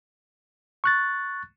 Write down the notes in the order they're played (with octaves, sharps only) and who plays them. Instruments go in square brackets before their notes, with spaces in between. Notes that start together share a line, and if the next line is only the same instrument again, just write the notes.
[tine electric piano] C#6 F#6 A6